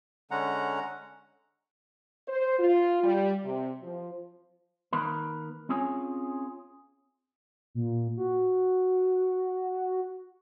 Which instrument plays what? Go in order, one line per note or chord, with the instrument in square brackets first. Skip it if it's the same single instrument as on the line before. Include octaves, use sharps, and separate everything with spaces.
[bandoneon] D3 G#3 C#4 F#5 A#5
[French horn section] C5
F4
G3
C3
F3
[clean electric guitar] D#3 A#3 A#4 B4
C4 C#4 F4 G#4 C#5 G#5
[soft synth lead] A#2
F#4